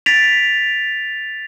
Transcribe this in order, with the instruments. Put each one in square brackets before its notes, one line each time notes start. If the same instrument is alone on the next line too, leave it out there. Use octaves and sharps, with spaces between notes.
[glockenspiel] A6 B6 D7 F7